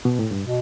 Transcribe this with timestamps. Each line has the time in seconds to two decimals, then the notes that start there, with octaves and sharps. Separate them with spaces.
0.05 B2
0.19 A2
0.31 G2
0.44 B2